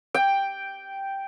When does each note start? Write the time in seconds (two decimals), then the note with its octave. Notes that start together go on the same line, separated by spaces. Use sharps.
0.14 G5